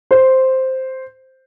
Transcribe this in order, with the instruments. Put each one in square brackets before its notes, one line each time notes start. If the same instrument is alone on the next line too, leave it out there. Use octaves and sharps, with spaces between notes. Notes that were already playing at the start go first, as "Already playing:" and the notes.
[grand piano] C5